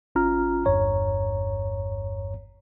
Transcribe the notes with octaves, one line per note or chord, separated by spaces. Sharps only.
A1 C#4 F4 A#5 F6
G1 E2 G2 C#5 A#5